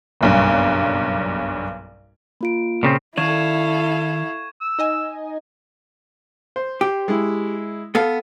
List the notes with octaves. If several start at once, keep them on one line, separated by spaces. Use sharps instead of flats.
F#1 B1 G2
A#3 F4 D7
A#2 C#3 C4
D#3 E4 A4 D5 F5 C#6 G#6 E7
E6
D#4 D#5 G#5
C5
G4
G#3 E4
B3 A4 F5